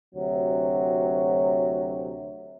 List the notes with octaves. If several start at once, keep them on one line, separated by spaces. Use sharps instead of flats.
D2 C3 F#3